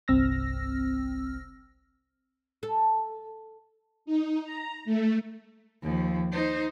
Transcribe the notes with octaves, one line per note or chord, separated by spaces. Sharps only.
G1 C2 C4 E6 F6 A#6
A4
D#4
A#5
A3
D#2 F3
D#4 C5